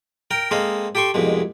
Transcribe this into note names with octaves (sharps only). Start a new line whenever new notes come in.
A#4 G5 A#5
G#3 A#3 C4 A4 D#5 F5
G4 A4 G5 C6 C#6
C2 F2 B2 G#3